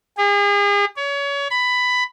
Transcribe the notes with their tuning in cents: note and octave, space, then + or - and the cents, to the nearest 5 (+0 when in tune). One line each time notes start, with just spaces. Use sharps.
G#4 -40
C#5 +30
B5 +10